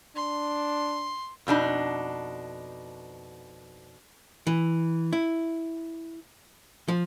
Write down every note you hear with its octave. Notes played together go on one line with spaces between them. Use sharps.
D4 C6
F2 B2 D4 D#4
E3
E4
F3